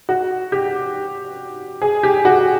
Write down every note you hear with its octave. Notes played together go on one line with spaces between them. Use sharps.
F#4
G4
G#4
G4
F#4